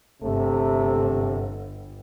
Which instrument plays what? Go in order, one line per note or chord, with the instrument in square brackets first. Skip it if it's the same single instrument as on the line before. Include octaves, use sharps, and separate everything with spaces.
[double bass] G1 [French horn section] C3 A3